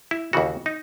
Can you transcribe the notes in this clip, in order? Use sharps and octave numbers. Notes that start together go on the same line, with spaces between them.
E4
D#2 C#3 E3 F#4
D#4